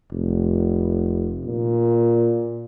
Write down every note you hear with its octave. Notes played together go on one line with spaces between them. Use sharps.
F1
A#2